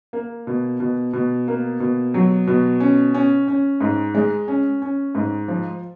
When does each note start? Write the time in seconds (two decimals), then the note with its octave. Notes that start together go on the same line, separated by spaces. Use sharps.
0.13 A#3
0.47 B2
0.80 B2
1.13 B2
1.48 A#3
1.80 B2
2.14 F#3
2.47 B2
2.80 C#4
3.14 C#4
3.48 C#4
3.81 G#2
4.15 G#3
4.48 C#4
4.82 C#4
5.15 G#2
5.48 F3